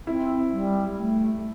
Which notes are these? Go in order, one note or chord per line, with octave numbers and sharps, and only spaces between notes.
C4 E4
G3
A3